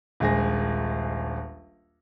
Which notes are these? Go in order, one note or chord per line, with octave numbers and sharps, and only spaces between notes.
D#1 A#1 G#3 G#5 A#6